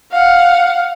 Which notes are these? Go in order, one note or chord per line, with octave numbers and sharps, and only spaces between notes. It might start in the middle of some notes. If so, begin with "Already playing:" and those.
F5 F#5